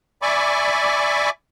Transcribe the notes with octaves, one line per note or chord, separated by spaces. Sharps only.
D5 E5 G#5 B5 C#6 D6